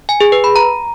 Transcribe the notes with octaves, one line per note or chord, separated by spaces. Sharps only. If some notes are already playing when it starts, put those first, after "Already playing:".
G#5
G#4
B4
B5
A#5